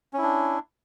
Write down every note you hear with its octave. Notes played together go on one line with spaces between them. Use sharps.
C#4 D4 E4